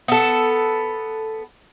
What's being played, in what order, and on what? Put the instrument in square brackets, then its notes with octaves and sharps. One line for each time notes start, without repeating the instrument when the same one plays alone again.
[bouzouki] B3 A4